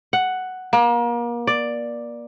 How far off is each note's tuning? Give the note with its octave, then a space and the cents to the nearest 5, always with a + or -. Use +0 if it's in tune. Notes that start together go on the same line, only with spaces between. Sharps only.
F#5 +5
A#3 +35
D5 +5